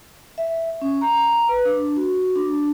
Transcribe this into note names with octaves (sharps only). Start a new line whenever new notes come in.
E5
C#4
A#5
B4
D4
F#4
D4